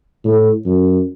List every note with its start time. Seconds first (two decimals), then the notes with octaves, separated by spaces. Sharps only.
0.25 A2
0.66 F#2